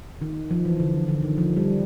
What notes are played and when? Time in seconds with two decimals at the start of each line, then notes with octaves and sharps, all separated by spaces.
0.22 D#3
0.51 F3
0.65 E3
0.80 D3
1.08 D3
1.22 D#3
1.38 F3
1.57 G3